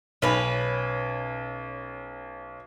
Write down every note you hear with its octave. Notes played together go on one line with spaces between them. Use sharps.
B1 C#4 B4